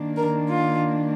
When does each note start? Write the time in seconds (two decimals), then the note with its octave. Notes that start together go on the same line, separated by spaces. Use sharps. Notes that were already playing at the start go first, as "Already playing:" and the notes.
Already playing: D#3 A#3 D4
0.16 A#4
0.49 F4